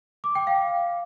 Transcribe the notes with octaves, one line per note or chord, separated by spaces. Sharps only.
D6
G5
F5